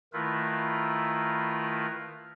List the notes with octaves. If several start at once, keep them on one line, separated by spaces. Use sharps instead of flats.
D#3 A3 E4 F4 A#4 B4